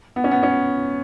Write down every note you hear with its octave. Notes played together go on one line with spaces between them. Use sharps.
B3
C#4
B3
C#4